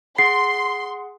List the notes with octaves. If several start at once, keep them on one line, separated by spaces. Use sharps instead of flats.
G#4 F#5 C6 C7